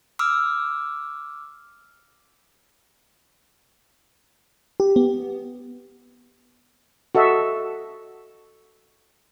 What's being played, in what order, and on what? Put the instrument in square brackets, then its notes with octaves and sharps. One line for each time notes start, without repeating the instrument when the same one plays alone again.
[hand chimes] D6 E6 F6
[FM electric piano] G4
B3
[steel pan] F#4 A4 D#5 E5